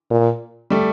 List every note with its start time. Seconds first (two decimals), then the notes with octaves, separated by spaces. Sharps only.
0.10 A#2
0.70 G3 A3